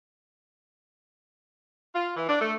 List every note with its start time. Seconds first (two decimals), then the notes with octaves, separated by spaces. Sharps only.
1.95 F4
2.17 E3
2.29 D4
2.41 A3